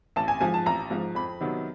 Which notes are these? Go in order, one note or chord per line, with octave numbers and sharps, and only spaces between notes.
A1 A5
G#5
G#2 F3 G#5
A5
A1 A#5
G#2 F3
F2 B5
C3 D#3 F#3 B3